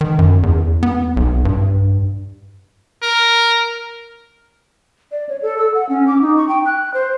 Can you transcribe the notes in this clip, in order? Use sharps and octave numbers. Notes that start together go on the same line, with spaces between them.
D#3
F#2
E2
B3
B1
G2
A#4
D5
C#5
A4
E6
F#5
C#4
D6
D#4
C#6
G5
F#6
C5